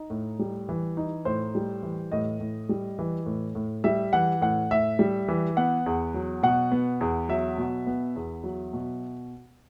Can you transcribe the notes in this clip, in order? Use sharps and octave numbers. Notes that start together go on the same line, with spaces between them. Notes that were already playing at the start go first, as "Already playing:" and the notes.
Already playing: D#4
A2
G3
E3
D#4
A2 C5
G3
E3
A2 D#5
A2
G3
E3
A2
A2
G3 E5
E3 F#5
A2 F#5
A2 E5
G3
E3
B3 F#5
E2
F#3
B2 F#5
B3
E2
F#3 E5
B2
B3
E2
F#3
B2